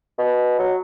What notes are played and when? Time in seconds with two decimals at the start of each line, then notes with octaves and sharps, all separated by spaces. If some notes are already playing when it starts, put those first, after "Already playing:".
0.18 B2
0.59 F#3